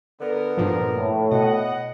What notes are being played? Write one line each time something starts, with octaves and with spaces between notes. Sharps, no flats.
D3 B3 A#4
G2 A#2 F3
A2
B2 D#5 F#5